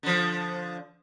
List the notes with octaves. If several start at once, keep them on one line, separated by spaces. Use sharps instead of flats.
D3 F3